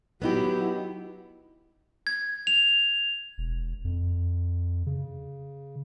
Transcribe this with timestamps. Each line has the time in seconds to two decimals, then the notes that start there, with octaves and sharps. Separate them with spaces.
0.22 F#3 B3 D#4 E4 G4
2.07 G#6
2.47 F7
3.38 E1
3.84 F2
4.86 C#3